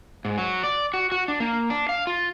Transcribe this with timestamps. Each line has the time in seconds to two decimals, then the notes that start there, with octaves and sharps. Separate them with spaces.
0.25 G#2
0.38 F#3
0.63 D5
0.94 F#4
1.12 F#4
1.28 D4
1.40 A#3
1.70 D4
1.89 F5
2.07 F4